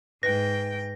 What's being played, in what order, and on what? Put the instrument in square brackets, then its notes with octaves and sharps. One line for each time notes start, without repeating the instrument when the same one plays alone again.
[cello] G#2 G5 [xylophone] B4 [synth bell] A#6